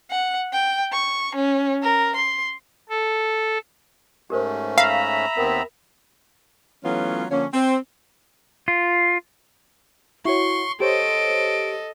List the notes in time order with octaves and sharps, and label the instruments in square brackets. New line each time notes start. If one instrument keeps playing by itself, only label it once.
[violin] F#5
G5
C#6
C#4
A#4
C6
[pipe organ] A4
[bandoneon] G#2 A3 C#4 [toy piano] G4 A#4 C5
[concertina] E5 A#5 B5 [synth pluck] F5
[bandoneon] D#2 B3 C4 [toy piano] A#4
[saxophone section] E3 F#3 A3 B3 C#4 F4
D3 F3 A#3 C#4
C4
[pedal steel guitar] F4
[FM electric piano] E4 F#4 C#5 [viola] C6 [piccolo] C#6
[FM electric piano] G4 C5 C#5 [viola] A4 D#5 [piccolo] D7